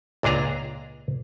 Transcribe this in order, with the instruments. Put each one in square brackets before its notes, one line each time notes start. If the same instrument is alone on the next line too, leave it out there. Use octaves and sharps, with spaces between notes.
[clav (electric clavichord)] C#2 A#2 D4 G#4 A#5